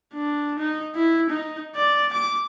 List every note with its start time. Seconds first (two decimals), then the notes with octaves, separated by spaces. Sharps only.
0.14 D4
0.59 D#4
0.95 E4
1.29 D#4
1.76 D5
2.13 D6